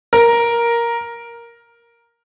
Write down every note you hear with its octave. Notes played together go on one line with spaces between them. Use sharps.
A#4